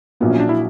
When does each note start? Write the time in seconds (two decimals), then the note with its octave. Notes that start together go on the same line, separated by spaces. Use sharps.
0.20 A#1 A#2 F#3 A#3 B3
0.31 C#4
0.40 D4
0.49 E4